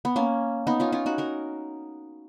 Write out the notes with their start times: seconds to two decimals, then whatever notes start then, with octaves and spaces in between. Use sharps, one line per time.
0.05 B3
0.16 A#3 C#4
0.67 B3 D#4
0.80 C#4 F4
0.92 C#4 F4
1.06 D#4 F#4
1.18 F#4 A#4